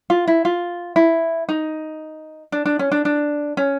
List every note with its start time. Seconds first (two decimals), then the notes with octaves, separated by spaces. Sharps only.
0.10 F4
0.27 E4
0.45 F4
0.96 E4
1.49 D#4
2.52 D4
2.66 D4
2.79 C#4
2.92 D4
3.05 D4
3.57 C#4